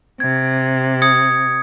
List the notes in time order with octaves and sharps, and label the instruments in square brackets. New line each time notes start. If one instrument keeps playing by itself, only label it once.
[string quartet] C3 [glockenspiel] G#6
[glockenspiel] D#6 G#6 C#7